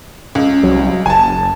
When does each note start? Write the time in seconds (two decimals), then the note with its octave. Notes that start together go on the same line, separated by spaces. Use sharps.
0.35 C#2
0.63 C2 F#3
1.06 F#1 G#5 A5